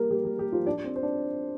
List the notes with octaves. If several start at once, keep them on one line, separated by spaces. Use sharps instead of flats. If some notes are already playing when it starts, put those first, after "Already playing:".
Already playing: G3 A#3 G4 A#4
G3 G4
G3 G4
G3 G4
F3 F4
D4 D5
C4 C5
C5
D4 D5